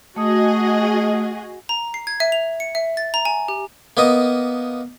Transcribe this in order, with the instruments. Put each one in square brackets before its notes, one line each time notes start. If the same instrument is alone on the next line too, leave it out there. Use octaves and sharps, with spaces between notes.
[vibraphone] A3 D#6 [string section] F#4 G#4 D#5
[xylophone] A#5
C7
G#6
E5
F7
C#7
E5
A6
A#5
G#5
G4
[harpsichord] A#3 B3 D#5